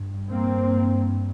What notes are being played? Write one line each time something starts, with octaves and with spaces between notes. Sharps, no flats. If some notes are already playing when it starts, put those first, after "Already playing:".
Already playing: G2
A#3 C4